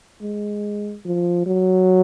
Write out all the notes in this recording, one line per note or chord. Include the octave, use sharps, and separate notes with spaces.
G#3
F3
F#3